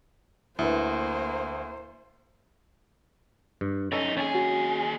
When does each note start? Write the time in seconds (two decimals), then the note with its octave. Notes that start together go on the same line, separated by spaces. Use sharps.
0.59 D2 A#3 E4 B4 C5
3.61 G2
3.92 F#2 C#4 D#4 A4
4.17 D#2 C#4 G#4
4.35 F#4